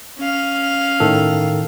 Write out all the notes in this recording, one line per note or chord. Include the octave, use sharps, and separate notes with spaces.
C#4 F5
A2 D#3 A4